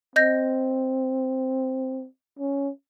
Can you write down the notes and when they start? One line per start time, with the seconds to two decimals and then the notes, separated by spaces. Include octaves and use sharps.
0.16 C4 D#5 G6 A#6
2.39 C#4